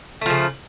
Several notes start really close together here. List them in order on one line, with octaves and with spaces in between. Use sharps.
A3 F3 C#3